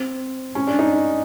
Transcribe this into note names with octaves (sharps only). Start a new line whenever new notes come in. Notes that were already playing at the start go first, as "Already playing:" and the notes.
Already playing: C4
C#4
D4
D#4